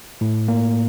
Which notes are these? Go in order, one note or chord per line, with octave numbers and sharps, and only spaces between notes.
A2
A#3